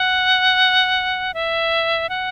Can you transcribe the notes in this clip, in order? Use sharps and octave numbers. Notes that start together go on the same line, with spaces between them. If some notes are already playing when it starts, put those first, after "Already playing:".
Already playing: F#5
E5
F#5